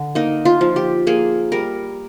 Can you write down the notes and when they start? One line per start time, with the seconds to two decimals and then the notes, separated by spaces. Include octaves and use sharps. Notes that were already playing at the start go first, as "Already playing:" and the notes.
Already playing: D3
0.15 A#3 D#4
0.45 F4
0.61 F3
0.76 G4
1.07 A#3 G#4
1.52 G3 A#4